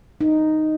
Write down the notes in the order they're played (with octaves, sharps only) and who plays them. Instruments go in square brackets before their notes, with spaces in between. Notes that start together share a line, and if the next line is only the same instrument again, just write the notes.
[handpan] D#4